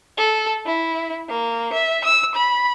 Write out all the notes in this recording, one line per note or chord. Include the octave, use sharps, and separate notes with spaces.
A4
E4
A#3
E5
E6
B5